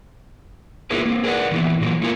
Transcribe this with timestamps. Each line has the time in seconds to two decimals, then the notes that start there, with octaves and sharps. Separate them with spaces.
0.91 A#3 E4 F4 G#4 A#4 B4
1.06 A#3 C4
1.24 G#4 A#4 B4 D5 F#5
1.51 A#2 D#3 E3 B3 E4
1.80 A#2 E3 F#3 A#3
2.02 A3 A#3 E4 F4 A#4 G#5